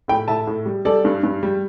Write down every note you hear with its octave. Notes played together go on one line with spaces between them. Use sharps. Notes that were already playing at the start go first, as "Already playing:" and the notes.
A2 G5 B5
A2 E5 A5
A2
G3
G3 A4 D5
G2
G2
G3